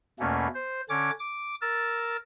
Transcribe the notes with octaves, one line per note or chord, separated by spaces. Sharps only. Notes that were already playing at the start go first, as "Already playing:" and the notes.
E2 B2 A3 A#3 C#4
C5
D3 C#4 C#5 D6
D6
A#4 E6 A6